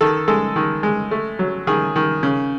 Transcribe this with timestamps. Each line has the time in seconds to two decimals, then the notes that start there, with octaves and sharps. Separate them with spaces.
0.01 D#3 A4
0.28 G#3 A4
0.56 D#3
0.83 G#3
1.11 A3
1.39 F#3
1.67 D#3 G#4
1.96 D#3
2.23 C#3